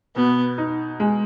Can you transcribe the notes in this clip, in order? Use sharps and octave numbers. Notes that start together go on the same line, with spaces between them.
B2 B3
D#4
G#3